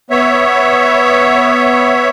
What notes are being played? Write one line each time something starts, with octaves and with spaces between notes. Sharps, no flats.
B3 C#5 E5